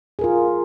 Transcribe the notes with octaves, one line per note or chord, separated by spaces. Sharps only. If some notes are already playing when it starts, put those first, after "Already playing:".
F4 G#4 A#4